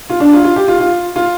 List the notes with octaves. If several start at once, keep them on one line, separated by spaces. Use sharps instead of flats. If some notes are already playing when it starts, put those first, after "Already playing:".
F4
D4
F4
F4
G4
F4
F4
F4